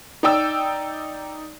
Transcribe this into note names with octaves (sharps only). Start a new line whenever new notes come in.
D#4 D5 G5 E6